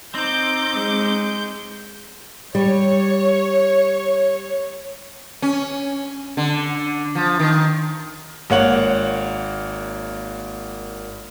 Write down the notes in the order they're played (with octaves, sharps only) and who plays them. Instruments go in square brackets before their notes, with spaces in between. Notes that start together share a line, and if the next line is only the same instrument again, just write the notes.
[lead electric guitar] C4 [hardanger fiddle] D#4 D6 [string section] G6
[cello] G#3
[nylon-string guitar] G3 [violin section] C#5
[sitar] C#4
D3
F3
D#3
[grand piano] G#1 A#3 C#5 F#5 F#7